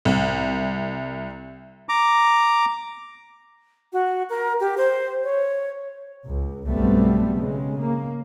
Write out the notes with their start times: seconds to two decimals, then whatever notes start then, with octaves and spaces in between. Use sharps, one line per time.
0.05 C2
1.89 A#5 D6
3.93 F#4
4.30 A#4
4.60 G4
4.78 C5
5.24 C#5
6.25 C#2
6.66 B1 G2 G3 A3 B3 C4
7.35 C#3 G#3
7.80 A#3